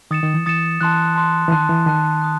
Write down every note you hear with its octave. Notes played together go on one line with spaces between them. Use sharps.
D#3 D#6 A6 C#7 E7
D#3
E3
E3 D#6 A6 C#7 E7
E3 A5 C6 F#6
A5 C6 F#6
E3
D#3 A5 C6 F#6
E3
D#3 A5 C6 F#6
D#6 F#6